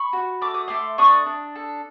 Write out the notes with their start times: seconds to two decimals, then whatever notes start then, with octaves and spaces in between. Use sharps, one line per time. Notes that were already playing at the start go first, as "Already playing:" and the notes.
Already playing: B5 C#6
0.13 F#4
0.41 A3 D6
0.54 D#6
0.68 A3 C6 D6
0.98 D4 C#6 D#6
1.26 D4
1.55 A4